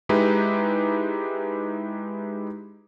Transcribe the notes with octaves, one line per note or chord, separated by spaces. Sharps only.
G#3 D#4 E4 G4 B4